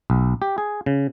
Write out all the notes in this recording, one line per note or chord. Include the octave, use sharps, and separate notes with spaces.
B1
G4
G#4
C#3